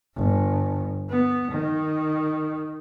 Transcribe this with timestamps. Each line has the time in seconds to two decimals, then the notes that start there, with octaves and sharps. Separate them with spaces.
0.16 G1
1.09 B3
1.51 D#3